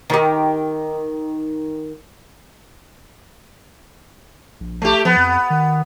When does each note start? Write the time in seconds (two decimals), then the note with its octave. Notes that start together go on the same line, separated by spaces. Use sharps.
0.10 D#3 G4
4.60 A#1
4.82 A3 G4
5.05 F3 B3
5.17 F2
5.50 D#3